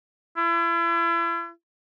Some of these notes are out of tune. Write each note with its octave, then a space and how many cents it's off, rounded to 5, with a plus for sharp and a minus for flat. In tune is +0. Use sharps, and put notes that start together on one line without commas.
E4 +40